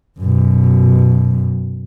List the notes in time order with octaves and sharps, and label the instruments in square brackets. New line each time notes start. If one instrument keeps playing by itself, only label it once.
[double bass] F#2 B2